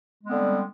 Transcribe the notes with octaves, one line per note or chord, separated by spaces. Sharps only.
D3 G3 G#3 B3 C4